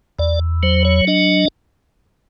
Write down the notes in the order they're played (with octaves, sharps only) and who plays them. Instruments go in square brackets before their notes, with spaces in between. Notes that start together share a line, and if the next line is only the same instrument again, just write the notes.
[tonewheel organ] E2 D5
F#3 C5
C#5
D4 D#5